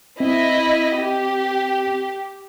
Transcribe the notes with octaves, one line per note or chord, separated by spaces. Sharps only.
C4 E4 D#5
G4